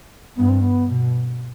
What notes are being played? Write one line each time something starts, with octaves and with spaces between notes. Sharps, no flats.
G2 B3
C4
B3
B2